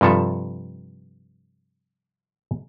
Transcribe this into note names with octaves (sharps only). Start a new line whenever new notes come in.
G2 C3 F3 A4 E5